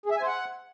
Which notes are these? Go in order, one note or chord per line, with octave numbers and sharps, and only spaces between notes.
G#4
E5
G#5
C5
F#5